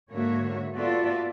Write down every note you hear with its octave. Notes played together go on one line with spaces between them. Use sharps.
G#2 D3 A#3 F#4 C#5 E5
B3 F4 F#4 A4 D5 E5